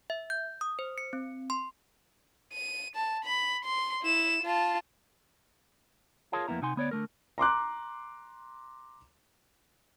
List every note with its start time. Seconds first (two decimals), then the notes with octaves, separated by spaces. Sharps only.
0.10 E5
0.30 G6
0.61 D#6
0.79 C5
0.98 C#7
1.13 C4
1.50 C6
2.53 D#7
2.95 A5
3.25 B5
3.65 C6
4.02 E4 E7
4.43 F4 A5
6.32 F4 G#4 A#4 C#5 F5 A5
6.48 F2 A#3 B3 E4 A#5
6.62 C3 D#4 F#5 G#5 C6
6.76 D2 B3 C#5 D5
6.91 D3 A3 A#4
7.38 A#5 C6 D6 F#6